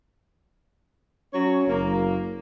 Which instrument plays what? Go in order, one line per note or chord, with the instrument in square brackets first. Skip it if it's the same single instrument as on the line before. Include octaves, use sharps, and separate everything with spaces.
[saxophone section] F#3 C#5 [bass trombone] C#4
[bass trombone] F#1 [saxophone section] A#3